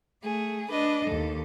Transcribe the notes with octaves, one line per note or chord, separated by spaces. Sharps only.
A3 G#4
D4 B4 D#5
D#2 A4